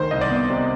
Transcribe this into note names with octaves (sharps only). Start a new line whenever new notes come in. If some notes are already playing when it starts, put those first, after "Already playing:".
Already playing: D2 D#3 C5
C2 D#5
D5
B3
C3